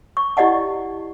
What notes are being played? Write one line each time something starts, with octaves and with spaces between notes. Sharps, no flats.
C#6
E4 G4 D5 D#5 F#5 A5